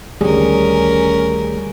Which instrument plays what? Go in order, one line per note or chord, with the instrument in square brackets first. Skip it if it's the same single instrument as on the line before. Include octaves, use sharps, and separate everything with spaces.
[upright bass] D2 D#3 [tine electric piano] G3 G4 G#4 [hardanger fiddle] C#4 A#4